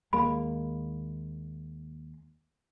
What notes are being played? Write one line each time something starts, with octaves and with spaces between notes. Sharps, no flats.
D#2 G#3 A#3 B5